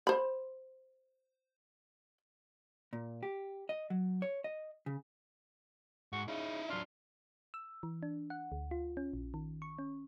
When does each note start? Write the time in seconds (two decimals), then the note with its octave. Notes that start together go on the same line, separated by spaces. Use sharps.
0.07 C5 B5
2.93 A#2
3.23 G4
3.69 D#5
3.90 F#3
4.22 C#5
4.44 D#5
4.86 C#3
6.13 G#2 F#4
6.28 C#3 D#4 E4
6.70 F#3 D4 F4
7.54 E6
7.83 E3
8.03 D4
8.30 F#5
8.52 D2
8.71 F4
8.97 C#4
9.13 A#1
9.34 D#3
9.62 C#6
9.79 C#4